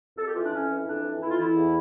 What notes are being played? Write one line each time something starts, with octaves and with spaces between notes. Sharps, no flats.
F2 A4
G4
E3 F4
D4
F2 C#4
E3
F2 D4
E3
F2 E4
F4
E3 E4
E2